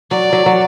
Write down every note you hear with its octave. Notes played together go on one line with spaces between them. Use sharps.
F#3 D5
F#3
F#3